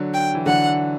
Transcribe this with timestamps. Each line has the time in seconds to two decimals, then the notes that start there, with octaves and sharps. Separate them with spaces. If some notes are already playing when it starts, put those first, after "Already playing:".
Already playing: D3 F#3
0.14 G5
0.35 E3
0.46 D3 F#3 F#5